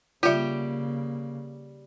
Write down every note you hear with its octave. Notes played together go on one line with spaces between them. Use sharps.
C#3 G3 A#3 F4 G4 E5